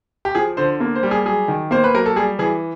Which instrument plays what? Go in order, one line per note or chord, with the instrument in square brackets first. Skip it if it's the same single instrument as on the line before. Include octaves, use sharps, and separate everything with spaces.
[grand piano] G4
F3 G#4
D3 C5
A#3
C5
G3
G#4
F#3 G#4
D#3
A#3 C5
B4
F#3 A#4
A4
G3 G#4
E3 G#4